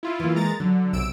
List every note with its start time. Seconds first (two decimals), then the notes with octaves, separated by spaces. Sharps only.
0.03 E4 F4
0.19 E3 A#3
0.35 G#3 A#5 A6
0.60 D3 F#3
0.93 B1 C3 E6 D7